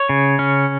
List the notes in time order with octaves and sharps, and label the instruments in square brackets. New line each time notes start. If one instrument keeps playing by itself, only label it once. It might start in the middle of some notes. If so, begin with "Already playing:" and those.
Already playing: [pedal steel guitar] C#5
C#3
C#4